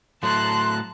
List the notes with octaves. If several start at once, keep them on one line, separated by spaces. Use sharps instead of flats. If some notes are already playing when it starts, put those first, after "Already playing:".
A2 F#3 A3 A5 A#5 C6 F#6